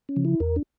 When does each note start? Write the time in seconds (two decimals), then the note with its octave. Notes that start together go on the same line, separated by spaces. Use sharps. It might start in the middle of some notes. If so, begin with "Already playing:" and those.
0.09 C#4
0.16 C#3 F3
0.25 E4
0.40 E2 A#4
0.56 D4